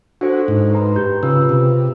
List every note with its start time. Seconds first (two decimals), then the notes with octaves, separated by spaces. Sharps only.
0.21 D4 F#4 A4 C5
0.48 G#2
0.73 B4 A#5 C6
0.96 G4 G6
1.23 C#3 F4 B4 E6
1.49 C3